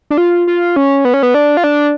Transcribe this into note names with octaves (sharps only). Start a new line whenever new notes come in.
D4
F4
F4
C#4
B3
C#4
B3
D4
F4
D4